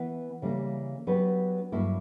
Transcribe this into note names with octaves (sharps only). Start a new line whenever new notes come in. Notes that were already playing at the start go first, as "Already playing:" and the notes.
Already playing: E3 B3 E4 B4
C#3 E3 G3 A#3
F#3 B3 D4 G4 B4
G2 F#3 A#3 E4